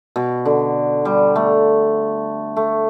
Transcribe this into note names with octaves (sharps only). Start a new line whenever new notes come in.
B2
D3
G3
A3
A3